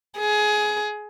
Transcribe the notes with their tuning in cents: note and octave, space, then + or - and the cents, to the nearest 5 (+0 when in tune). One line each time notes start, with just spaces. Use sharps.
G#4 +20